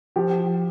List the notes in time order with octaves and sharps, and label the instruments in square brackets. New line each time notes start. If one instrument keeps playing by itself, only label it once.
[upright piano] F3 G4